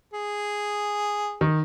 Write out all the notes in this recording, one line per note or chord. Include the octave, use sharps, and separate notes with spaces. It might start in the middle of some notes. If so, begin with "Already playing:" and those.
G#4
D#3